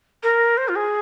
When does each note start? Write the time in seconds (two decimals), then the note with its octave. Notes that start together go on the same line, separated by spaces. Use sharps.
0.23 A#4
0.57 C5
0.68 F4
0.76 G#4